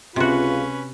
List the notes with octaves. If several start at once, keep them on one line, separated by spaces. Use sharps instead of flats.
C#2 C3 C#4 F4 F#4 B4